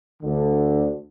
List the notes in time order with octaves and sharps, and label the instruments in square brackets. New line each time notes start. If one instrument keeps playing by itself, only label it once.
[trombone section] D2 D3